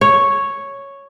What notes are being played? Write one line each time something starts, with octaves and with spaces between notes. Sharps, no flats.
C#5